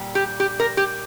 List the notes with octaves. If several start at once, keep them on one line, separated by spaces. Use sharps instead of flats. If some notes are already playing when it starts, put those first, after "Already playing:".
Already playing: A#2 G3
G4
G4
A#4
G4